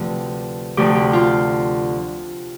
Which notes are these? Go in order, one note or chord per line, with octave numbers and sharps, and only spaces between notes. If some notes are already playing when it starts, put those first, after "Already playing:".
Already playing: D2 C3 F3 B4
D2 C3 F3 G4
G4
F4